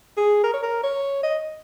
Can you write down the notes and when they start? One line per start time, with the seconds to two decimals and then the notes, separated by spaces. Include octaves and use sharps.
0.17 G#4
0.43 A#4
0.53 C#5
0.63 A#4
0.83 C#5
1.23 D#5